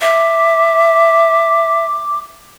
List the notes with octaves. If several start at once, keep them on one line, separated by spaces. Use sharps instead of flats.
E5 D6